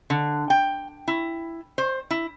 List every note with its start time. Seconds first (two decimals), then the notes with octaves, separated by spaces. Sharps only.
0.10 D3
0.50 G5
1.08 E4
1.78 C5
2.11 E4